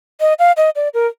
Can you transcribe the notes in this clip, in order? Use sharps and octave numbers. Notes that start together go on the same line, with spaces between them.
D#5
F5
D#5
D5
A#4